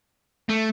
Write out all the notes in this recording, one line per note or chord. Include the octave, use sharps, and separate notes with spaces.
A3